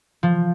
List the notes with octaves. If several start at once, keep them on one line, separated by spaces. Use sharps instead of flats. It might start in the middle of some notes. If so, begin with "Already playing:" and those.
F3